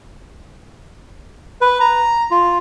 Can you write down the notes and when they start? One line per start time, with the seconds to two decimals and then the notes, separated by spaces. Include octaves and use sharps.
1.61 B4
1.80 A#5
2.31 F4